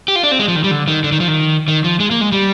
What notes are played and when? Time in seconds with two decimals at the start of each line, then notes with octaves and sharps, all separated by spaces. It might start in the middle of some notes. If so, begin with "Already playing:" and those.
0.08 G4
0.16 F4
0.23 D4
0.32 C4
0.39 G#3
0.48 F3
0.56 D#3
0.64 G3
0.71 D3
0.88 D#3
1.04 D3
1.12 D#3
1.20 F3
1.28 D#3
1.68 D#3
1.84 F3
2.00 G#3
2.11 A#3
2.21 G#3
2.32 G3